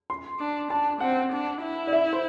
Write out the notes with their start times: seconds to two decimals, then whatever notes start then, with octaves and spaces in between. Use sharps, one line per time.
0.10 C6
0.39 D4
0.70 D4 A5
1.00 C4 F#5
1.32 D4
1.62 E4
1.87 D5
1.93 E5
2.13 C5